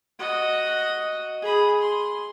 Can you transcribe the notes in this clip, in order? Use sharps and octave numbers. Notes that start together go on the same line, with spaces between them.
F#4 D#5
G#4 B5
C6